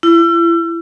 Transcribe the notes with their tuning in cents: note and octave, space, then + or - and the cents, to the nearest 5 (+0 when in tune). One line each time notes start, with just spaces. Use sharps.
E4 +35